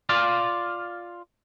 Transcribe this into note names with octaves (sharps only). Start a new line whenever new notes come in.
F4 D5 F5